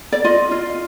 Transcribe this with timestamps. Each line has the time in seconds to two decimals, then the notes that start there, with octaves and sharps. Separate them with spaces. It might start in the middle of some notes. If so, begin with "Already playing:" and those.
0.12 D5
0.24 F4 D#5
0.51 F4